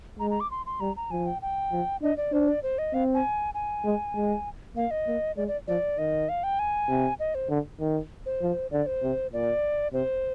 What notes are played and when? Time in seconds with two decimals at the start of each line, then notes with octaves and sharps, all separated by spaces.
0.19 G#3 A#5
0.30 A#5
0.40 D6
0.51 C6
0.66 C6
0.80 G3 A#5
0.96 A#5
1.11 F3 G#5
1.26 G5
1.42 G5
1.72 F3
2.02 D4 D#5
2.17 D5
2.32 D4 C5
2.48 D5
2.63 C5
2.78 D#5
2.93 C4 F5
3.14 G#5
3.54 G#5
3.84 G#3
4.15 G#3
4.76 A#3 F5
4.91 D#5
5.07 A#3
5.37 G#3 D5
5.48 D5
5.68 F3 D5
5.98 D#3 D#5
6.29 F5
6.43 G5
6.59 G#5
6.89 C3
7.20 D#5
7.35 C5
7.49 D3
7.80 D#3
8.26 C5
8.42 F3
8.71 D3 D5
8.86 C5
9.03 C3
9.33 A#2 D5
9.93 C3 C5